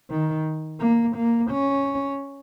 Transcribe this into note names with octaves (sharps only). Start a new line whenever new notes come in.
D#3
A#3
A#3
C#4